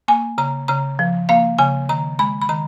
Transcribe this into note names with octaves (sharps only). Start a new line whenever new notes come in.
A#3 G#5
C#3 A#5
C#3 A#5
F3
A#3 F5
C#3 G#5
D#3 A#5
G#3 B5
B5
D#3 A#5